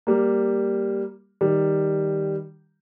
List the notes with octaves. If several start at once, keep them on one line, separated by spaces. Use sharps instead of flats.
G3 A#3
D#3 G3